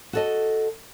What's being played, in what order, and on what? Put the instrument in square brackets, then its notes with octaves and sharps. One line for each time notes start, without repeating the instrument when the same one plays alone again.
[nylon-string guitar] F#4 A4 D#5